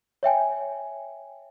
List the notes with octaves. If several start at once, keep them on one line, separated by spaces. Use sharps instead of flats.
C#5 E5 G5 G#5